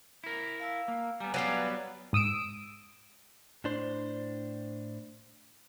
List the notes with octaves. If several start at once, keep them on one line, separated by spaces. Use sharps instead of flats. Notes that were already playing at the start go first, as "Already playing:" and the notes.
E4 A#4
F5 A5 E6
A#3
G3 B3 G#5 A#5
F#3 G3 B3 B4 D5 F5
G#2 D#6 E6 D7
A2 D4 C5